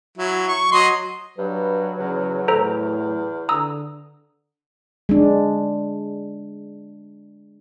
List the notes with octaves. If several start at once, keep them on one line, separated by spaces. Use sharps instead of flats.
F#3 E4
C#6
F#3 D#5 C6
G2 F#3 B4
E2 C#3
A2 A4 C5 A#5
D3 A#5 D#6 E6
G#3 D4